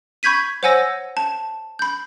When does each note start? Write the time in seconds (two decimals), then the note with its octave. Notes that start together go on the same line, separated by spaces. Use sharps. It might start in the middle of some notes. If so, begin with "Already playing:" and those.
0.23 B5 C#6 G6 G#6 B6 D#7
0.63 C5 C#5 F#5 G#5 E6 A#6
1.17 A5
1.79 B5 G6